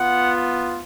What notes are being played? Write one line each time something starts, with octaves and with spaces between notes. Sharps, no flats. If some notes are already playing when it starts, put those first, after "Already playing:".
Already playing: B3 F4 F#5